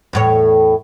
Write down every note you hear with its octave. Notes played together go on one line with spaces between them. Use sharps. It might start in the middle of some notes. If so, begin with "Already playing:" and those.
E2 A2 C#5